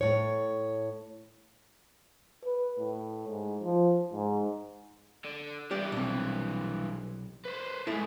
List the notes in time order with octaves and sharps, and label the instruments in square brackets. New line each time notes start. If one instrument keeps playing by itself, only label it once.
[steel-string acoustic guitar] A2 C#5
[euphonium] B4
A2
G#2
F3
G#2
[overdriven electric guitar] D3
[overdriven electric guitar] G2 E3 [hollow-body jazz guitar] G4 D5
[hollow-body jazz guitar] B1 C3
[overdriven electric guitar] B4 C5
[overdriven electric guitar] A2 G#3 [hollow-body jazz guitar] A3 E4